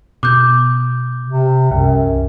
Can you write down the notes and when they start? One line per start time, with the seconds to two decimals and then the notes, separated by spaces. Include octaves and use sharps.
0.23 B2 D6 G6
1.26 C3
1.71 C2 F#2